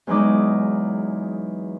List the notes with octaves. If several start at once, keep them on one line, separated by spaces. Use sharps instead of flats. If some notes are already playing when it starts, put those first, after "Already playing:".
E2 F#3 G#3 D#4 D6